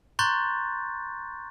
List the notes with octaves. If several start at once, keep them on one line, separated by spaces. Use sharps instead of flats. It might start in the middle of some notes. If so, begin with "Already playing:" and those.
A#5 C6 C#6 F#6 G6 A6